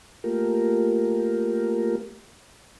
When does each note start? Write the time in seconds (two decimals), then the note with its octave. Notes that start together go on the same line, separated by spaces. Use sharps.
0.24 A3 A#3 F4 G4 A#4